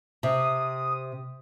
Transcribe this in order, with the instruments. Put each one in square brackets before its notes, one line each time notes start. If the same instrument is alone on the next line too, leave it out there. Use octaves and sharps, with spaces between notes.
[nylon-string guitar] C3 [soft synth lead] D#6